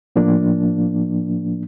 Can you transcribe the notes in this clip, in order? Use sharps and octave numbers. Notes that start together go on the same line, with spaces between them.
A2 F3 A#3 D4